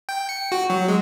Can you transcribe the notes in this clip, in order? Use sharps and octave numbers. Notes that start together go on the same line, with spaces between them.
G5
C#7
F#4
F#3
G#3